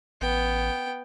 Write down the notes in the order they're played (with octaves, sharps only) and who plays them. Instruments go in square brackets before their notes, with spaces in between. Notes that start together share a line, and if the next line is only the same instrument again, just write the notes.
[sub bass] A1 [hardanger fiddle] B3 G5